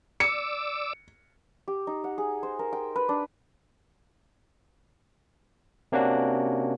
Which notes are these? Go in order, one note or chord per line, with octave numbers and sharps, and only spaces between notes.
D5 D6 E6 C#7
G4
D#4
F#5
G#4
C5
A#4
G5
B4
D4
C3 A#3 C#4 D4 F#4